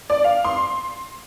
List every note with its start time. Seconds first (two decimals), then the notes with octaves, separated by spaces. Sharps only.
0.10 D5
0.24 F5
0.44 C6